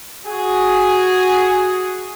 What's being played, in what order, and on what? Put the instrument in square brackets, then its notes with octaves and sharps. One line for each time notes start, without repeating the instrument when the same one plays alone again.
[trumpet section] F#4 G#4